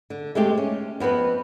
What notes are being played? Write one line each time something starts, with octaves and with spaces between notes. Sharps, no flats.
D3
G#3 A3 C4 G4
C#4
F2 B3 C4 B4